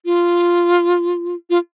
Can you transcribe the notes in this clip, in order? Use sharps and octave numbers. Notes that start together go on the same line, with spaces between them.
F4
F4